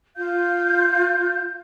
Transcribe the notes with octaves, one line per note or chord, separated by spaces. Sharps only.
F4 F5 G6